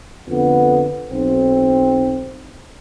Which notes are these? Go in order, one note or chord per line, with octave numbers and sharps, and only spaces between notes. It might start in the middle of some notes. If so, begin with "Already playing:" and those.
F2 D3 B3
B1 C4